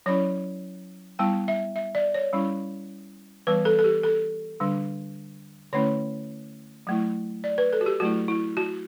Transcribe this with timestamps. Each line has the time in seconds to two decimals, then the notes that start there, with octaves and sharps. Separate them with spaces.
0.06 F#3 C#4 E4 C#5
1.19 G3 B3 E4 G5
1.48 E5
1.76 E5
1.95 D5
2.14 C#5
2.33 G3 C#4 E4
3.47 E3 G3 B3 B4
3.65 A4
3.79 A4
3.84 G4
4.03 A4
4.60 D3 G3 D4
5.73 D3 A3 C#4 E4 C#5
6.87 F#3 A3 E4
7.44 D5
7.58 B4
7.73 A4
7.81 F#4
7.86 G4
8.00 F#3 A3 E4 F#4
8.28 E4
8.57 F#4